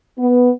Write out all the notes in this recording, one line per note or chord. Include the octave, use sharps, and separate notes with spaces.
B3